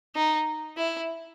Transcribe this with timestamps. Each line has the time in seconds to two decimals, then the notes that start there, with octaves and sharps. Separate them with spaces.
0.16 D#4
0.77 E4